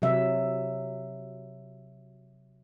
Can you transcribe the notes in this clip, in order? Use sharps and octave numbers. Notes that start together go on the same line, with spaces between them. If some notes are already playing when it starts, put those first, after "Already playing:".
C3 F#3 E5